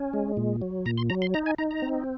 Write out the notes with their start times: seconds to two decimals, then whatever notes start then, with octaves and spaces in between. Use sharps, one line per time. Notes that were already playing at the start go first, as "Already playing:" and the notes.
Already playing: C#4
0.13 G#3
0.37 A#2
0.62 F#3
0.86 A#2 A#5
0.98 C6
1.10 F#3 A#5
1.22 C6
1.34 D#4 A#5
1.46 G#5
1.58 D#4 A#5
1.71 A#5
1.82 C4